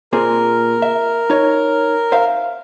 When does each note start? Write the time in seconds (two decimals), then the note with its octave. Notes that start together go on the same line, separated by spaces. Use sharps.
0.13 A#2 C4 G#4 A#4
0.82 E5
1.30 D#4 C#5
2.12 C5 E5 F5